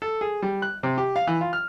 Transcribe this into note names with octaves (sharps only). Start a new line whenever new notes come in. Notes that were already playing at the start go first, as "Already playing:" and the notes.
A4
G#4
G3
F#6
C3
G4
F5
E3
F4
F6